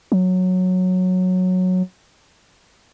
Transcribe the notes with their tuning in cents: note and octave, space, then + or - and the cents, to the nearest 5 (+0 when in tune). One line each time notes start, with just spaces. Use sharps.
F#3 -10